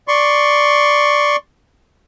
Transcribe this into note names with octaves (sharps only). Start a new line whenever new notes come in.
D5 C6 C#6